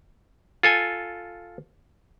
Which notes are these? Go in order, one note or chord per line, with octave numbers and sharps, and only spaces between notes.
F4 A4 G#5